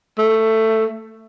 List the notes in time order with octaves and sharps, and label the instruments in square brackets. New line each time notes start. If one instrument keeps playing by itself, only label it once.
[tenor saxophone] A3